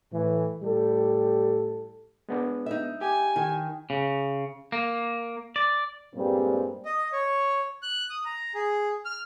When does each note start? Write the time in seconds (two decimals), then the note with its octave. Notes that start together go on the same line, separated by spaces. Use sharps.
0.11 A2 E3
0.63 A2 G3 G4 A4
2.29 G#3 B3 D4
2.66 D#4 E5
3.01 G4 G#5
3.36 D#3
3.90 C#3
4.72 A#3
5.56 D5
6.15 G2 A#2 G3 G#3 A#3 C4
6.85 D#5
7.13 C#5
7.83 F#6
8.10 D#6
8.25 A#5
8.55 G#4
9.05 F6